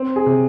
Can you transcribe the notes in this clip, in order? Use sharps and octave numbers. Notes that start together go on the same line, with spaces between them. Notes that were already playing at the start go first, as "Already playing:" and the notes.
Already playing: C4
G#4
C3